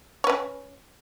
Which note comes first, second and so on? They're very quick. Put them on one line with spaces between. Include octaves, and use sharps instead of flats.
C#5 B4 C#4